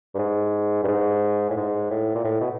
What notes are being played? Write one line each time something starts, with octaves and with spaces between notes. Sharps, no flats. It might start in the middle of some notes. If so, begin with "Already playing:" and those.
G2
G#2
G2
G#2
A2
G#2
A2
A#2
A2
B2